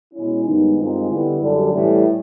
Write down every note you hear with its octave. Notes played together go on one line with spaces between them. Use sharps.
B2 G#3 C#4 E4
G2 D#3 G#3 B3 D#4
G2 D#3 G#3 C4 F4
D3 G3 B3 E4
F#2 D3 G3
A2 E3 G3